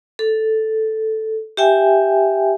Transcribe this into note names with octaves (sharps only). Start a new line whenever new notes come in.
A4
G4 E5 G5 G#5